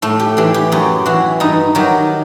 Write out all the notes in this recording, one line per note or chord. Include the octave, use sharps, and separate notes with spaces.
A2 A3
G4
E3 G4
G4
F#2 G4
E3 F#4
G2 D#4
D#3 F#3 G4